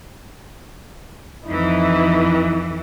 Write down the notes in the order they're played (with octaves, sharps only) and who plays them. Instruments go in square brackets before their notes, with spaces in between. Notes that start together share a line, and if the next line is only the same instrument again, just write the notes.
[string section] F2 E3 [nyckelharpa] D#4 E4